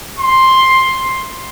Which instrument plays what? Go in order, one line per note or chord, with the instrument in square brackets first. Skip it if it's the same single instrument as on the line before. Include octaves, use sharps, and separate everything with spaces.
[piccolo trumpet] C6